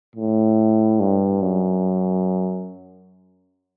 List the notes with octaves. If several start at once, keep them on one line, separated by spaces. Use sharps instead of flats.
A2
G2
F#2